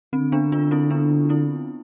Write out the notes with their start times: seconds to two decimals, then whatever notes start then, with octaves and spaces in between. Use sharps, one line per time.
0.13 D3 C4
0.32 B3 D4
0.52 D4 F4
0.71 C4 E4
0.90 B3 D4
1.29 C4 E4